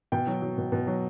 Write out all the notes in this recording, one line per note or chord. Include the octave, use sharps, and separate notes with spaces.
B2 G5
F#3
F#3
B2
B2
F#3